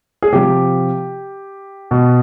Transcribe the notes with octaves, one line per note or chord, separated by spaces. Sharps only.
G#4
C3 F3 G4
B2